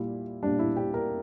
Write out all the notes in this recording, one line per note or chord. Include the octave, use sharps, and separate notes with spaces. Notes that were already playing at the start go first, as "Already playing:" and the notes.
Already playing: A#2 G3 E4
A#2 G3 D4
E4
G4
A#4